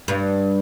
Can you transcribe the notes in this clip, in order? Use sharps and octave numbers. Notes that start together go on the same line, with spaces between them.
G2